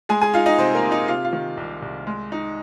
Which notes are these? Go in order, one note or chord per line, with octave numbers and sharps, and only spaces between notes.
G#3 G#4 G#5
G#4 G#5
D#4 F4 F5
D#4 D#5
C3 C4 C5
A#3 A#4
C3
D#4 D#5
C3 F4 F5
F4 F5
D#3
C2
C2
G#3
D#4